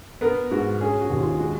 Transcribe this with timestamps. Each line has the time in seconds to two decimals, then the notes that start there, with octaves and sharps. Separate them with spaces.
0.21 B3 A#4
0.51 G#2 F#4
0.81 C#4 G#4
1.01 F#4
1.10 D#2
1.20 F4
1.39 G#3 F#4